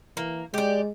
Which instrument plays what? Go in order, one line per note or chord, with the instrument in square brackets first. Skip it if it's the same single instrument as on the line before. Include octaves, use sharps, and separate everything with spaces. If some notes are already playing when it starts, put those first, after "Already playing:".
[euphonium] E3 [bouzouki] A#3
[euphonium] G#3 [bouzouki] G4 D5